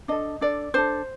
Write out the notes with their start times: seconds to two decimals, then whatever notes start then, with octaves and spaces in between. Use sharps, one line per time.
0.08 D4 A4 D#5
0.41 D4 A4 D5
0.74 D4 A4 C5